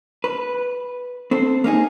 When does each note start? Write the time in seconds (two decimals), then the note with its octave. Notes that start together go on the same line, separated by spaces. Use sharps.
0.24 B4
1.31 C4 A4 C5
1.64 A#3 C#4 D#4 G#4